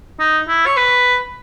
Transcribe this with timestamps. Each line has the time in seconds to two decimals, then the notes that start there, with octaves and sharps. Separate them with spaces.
0.19 D#4
0.48 E4
0.66 C#5
0.77 B4